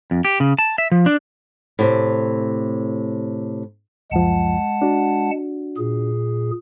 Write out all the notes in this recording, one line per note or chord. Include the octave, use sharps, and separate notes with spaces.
F2
G4
C#3
A5
E5
F3
D4
A2 C3
C#2 F#2 F3 G#3 F#5 A5
D4 F#4
A#2 G#4